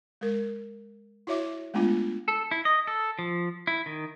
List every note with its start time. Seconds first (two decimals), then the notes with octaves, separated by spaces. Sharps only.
0.21 G#3 A#4
1.27 E4 F#4 C#5 E5 D6
1.74 G#3 A3 B3 D4 F4
2.28 A4
2.51 E4
2.65 D#5
2.87 A4
3.19 F3
3.67 E4
3.86 D#3